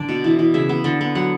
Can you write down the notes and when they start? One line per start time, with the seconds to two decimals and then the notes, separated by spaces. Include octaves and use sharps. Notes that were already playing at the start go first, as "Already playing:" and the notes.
Already playing: D3 D4 D5
0.09 B2
0.24 E3
0.39 E3
0.54 C#3 E5
0.69 B3
0.84 D3
1.01 B3
1.15 F#3 F#5